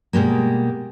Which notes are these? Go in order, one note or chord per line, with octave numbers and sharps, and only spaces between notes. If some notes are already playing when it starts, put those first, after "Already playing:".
B2 G3 G#3 A#3